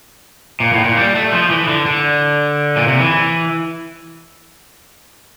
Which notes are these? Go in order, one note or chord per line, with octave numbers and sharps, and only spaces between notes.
A#2
A2
A#2
G3
A3
F3
E3
D3
D3
A#2
C3
E3